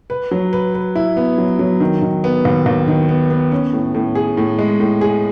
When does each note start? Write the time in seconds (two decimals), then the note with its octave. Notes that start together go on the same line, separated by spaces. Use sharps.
0.10 B4
0.31 F#3
0.53 B4
0.74 B4
0.95 E4
1.17 B3
1.38 F#3
1.59 F#3
1.80 D#3
2.02 D#3
2.24 B3
2.45 D#2
2.66 D#2
2.88 D#3
3.09 B3
3.30 B3
3.52 C#4
3.73 A2
3.94 A2
4.15 G#4
4.37 A2
4.59 G#3
4.80 A2
5.01 G#4